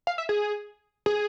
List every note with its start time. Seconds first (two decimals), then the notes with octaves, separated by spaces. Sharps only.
0.07 F5
0.18 E5
0.29 G#4
1.06 G#4